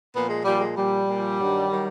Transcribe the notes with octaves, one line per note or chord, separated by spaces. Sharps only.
A#2 F3 B3
G#3
A#2 F3 G3
G#3
A#2 F3 G3
A#2
F3
G2 D#3 F#3
D#3 F#3